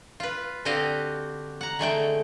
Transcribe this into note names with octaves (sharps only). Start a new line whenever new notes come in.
F4 B4
D3 C4 F#4 G4 D#5 F5
F#5 A#5
D3 G#3 A3 G5